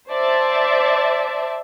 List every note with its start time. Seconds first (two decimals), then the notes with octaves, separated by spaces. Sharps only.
0.11 C5 D5 E5 A5